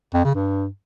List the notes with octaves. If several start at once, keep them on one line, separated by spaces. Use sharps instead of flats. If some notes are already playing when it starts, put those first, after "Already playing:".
F2
C#3
G2